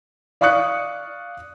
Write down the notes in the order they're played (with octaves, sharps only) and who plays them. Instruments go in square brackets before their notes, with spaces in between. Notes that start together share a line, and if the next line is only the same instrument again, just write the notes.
[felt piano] D5 F5 C#6 D#6 F#6 C#7